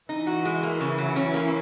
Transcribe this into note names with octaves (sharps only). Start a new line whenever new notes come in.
E3 D#4 E4
F#4
G#3
A#3
C#3
F#3
C#4
A#3